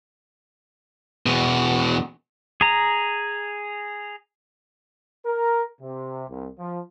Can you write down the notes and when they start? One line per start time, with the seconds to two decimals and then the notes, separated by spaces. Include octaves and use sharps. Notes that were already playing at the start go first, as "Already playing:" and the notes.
1.26 E2 B2
2.61 G#4 A#5
5.26 A#4
5.81 C3
6.29 C2
6.59 F3